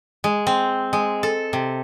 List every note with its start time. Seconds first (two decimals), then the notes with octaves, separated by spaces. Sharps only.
0.24 G#3
0.47 C4
0.93 G#3
1.23 A4
1.53 C3